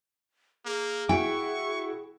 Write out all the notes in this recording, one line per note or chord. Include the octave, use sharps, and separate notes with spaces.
A#3 G#4
E4 F#4 G5 C#6